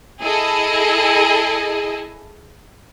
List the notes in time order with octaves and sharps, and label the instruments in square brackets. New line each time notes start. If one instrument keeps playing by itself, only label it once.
[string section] E4 G#4 A4 D#5